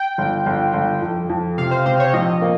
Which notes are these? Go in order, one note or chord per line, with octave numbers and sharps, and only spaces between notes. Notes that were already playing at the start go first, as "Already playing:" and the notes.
Already playing: G5
G1
G1
G1
F2
F2
C3 F5
C5
C3 C5
C#5
A#1 D#5
A#3